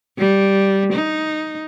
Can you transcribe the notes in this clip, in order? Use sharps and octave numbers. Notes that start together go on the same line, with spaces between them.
G3
D#4